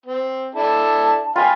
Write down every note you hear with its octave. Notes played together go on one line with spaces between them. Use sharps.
C4
D4 E4 A4 A5
F4 F5 G5 G#5 B5